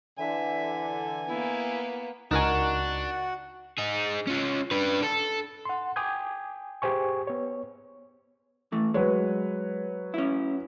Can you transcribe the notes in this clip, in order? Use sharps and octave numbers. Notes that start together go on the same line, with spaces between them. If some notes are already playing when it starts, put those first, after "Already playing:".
D3 E3 E5 G#5
A#3 B3 E4
C#2 D4 D#4 F#4 A#4 F#5 G#5 C#6
D#4 G#4
C#4 F4
D4 B4
A4
F#5 C6
G5 G#5 D6 D#6 G6 G#6
G4 G#4 C5 G#5 C#6
B3 C#5
E3 A3
F#3 G#3 B4 C#5
C#4 E4